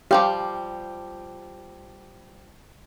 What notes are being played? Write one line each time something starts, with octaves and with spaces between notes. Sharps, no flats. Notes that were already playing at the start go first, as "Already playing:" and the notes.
F3 G3 G4 F5